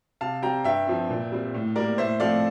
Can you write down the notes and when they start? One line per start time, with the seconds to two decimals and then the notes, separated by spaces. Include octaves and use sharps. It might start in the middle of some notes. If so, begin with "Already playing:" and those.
0.21 C3 F5 A5
0.42 G3 C4 G5 A#5
0.64 G2 E5 G5
0.87 F3 C4
1.10 A#2
1.32 G3 C4
1.54 A2
1.76 G3 A#3 A#4 D5
1.98 A2 C5 E5
2.20 F3 A3 C4 D5 F5